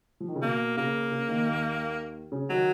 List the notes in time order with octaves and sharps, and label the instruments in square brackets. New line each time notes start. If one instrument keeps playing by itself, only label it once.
[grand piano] F3
D#3
C#3
[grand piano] B2 [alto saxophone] A#3
[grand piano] C#3 [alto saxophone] A#3
[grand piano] C#3
D#2 D#3
D#2 D#3
C#3 C#4
[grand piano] D#3 D#4 [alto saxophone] F#3